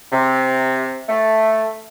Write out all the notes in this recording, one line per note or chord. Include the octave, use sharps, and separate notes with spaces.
C3
A3